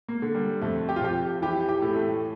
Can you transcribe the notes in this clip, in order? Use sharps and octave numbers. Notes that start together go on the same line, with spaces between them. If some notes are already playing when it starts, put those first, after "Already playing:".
A#3
D3
G3
F2 A3
G4
F4
F2 G4
E3 G4
G4
A2
A3